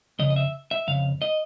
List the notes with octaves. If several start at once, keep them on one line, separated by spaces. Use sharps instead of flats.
F2 C#3 D#5
D#5
E5
E5
F2 C#3 F5
D#5